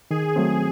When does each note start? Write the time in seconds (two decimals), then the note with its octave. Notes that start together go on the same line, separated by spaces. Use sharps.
0.11 D#3 G#4
0.36 F#3 A3 C4